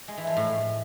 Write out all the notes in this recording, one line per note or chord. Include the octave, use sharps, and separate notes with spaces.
G#3
E3
F3
A2